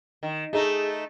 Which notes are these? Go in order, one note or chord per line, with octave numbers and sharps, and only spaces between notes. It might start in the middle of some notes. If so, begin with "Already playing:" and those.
D#3
A3 D#4 G#4